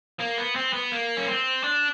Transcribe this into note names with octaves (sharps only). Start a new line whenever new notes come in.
A#3
B3
C4
B3
A#3
C#4
C4
D4